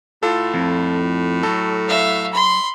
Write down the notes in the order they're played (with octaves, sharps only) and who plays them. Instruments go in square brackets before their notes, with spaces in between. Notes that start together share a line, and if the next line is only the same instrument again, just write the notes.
[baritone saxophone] A2 [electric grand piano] F4 A4
[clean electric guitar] F2
[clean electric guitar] F#3 [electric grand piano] A4
[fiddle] E5 F5
B5 C6